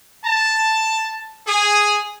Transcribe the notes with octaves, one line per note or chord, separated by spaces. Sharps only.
A5
G#4